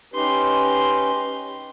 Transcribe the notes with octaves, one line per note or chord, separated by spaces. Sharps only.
C#4 D#4 G4 B4 C6